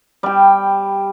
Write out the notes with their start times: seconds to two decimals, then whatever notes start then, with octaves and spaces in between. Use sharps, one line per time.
0.23 G3 G5